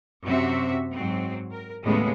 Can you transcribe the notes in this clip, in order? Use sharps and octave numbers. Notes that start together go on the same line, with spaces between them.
F#2 C3 C4 F#4 E5
G#2 F#3 C4
A#4
D#2 A2 C#3 G#3 B3